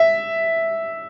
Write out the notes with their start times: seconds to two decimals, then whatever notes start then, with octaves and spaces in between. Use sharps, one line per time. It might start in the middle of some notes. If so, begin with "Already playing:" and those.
Already playing: E5